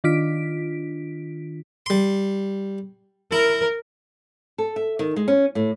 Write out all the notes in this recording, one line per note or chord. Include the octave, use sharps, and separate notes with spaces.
D#3 D4 F4 B6 D7
G3 C6
E4 A#4
A4
E5
D#3
G#3
C#4
A2